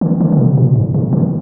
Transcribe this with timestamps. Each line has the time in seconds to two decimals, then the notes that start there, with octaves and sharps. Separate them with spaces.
0.01 D#3
0.20 D#3
0.32 D3
0.39 C3
0.57 A#2
0.76 G#2
0.94 C3
1.13 D#3